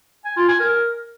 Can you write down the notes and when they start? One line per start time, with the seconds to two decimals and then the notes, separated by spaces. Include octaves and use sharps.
0.25 G#5
0.36 F4
0.48 G#5
0.60 A#4